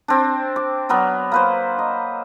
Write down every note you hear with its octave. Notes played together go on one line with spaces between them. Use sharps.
C4 D4
D6
F#3 B3 A#4 D5
A#3 B4 C5
D#5